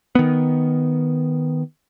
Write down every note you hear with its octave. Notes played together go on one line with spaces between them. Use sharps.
D#3 B3